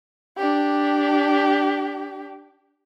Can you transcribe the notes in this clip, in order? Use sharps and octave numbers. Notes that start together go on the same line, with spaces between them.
D4 G4